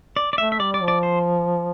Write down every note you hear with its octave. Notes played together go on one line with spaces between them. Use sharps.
D5
D5
A3 E5
E5
G3 D5
D5
F3
D5
C5